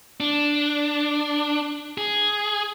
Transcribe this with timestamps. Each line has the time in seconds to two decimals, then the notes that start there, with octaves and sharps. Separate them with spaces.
0.20 D4
1.98 G#4